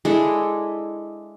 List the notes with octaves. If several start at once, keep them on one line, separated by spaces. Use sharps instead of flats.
G#3 D4 E4 A4